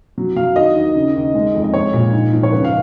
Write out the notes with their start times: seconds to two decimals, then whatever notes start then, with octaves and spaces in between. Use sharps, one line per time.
0.18 F#3
0.36 F#3 F5
0.56 D#3 D#5
0.75 D#2
0.95 C#3
1.16 D#2
1.35 G#3
1.55 F2
1.64 D#5
1.74 G#3 C#5
1.93 A#2
2.13 G#2
2.33 F3
2.43 C#5
2.52 C#2 B4
2.64 F5